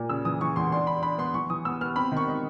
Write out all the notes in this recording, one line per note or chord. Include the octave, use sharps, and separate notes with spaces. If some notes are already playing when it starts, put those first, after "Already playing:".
Already playing: A#2
C#3 E6
E3 D#6
E3 C#6
E2 C6
D4 C6
D4 B5
D4 B5
B3 C6
E3 C#6
E3 D#6
B3 E6
B3 F6
C4 B5
D#3 C#6
D#4